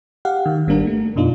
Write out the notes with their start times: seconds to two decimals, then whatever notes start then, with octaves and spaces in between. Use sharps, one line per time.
0.25 G4 F5 F#5
0.46 D#3
0.67 G#1 G3 A#3 D4 A#4
0.87 A3
1.16 F#2 B2 D4 D#4 F4